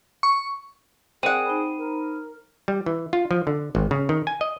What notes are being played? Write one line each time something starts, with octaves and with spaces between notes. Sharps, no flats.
C#6
C4 G#4 A#4 D5 F#5 D#7
D#4 C5 B5
A#4
G3
E3
F4
F3
D3
G#1
C#3
D#3
G#5
D#5